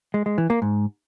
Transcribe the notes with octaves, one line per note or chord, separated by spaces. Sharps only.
G#3
G#3
E3
A#3
G#2